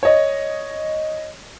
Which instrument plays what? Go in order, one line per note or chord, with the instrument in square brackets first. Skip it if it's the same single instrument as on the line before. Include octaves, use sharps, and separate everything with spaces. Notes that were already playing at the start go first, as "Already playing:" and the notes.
[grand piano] C#5 D#5